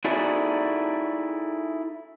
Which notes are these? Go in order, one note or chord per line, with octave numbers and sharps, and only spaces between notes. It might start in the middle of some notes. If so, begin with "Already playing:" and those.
D#4 E4 F#4 G#4 A4 D5